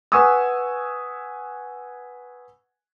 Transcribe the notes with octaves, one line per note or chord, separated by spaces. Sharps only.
B4 F#5 G#5 C#6 D#6 E6